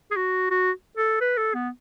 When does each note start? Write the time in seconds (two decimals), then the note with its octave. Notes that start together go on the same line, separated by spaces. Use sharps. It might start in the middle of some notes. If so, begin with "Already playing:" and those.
0.11 G#4
0.16 F#4
0.50 F#4
0.97 A4
1.20 B4
1.37 A4
1.54 B3